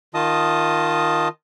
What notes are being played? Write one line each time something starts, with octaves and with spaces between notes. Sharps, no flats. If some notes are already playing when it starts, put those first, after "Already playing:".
D#3 F4 D#5 A5 D#6